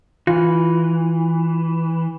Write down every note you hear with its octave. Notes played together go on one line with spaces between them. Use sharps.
E3 F4